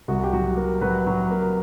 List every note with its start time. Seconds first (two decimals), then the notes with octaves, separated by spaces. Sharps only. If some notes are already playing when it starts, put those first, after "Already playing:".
0.08 C2 F#4
0.24 G4
0.33 F#3 F#4
0.57 A#3
0.81 F#3 B4
1.07 F#3
1.31 A#3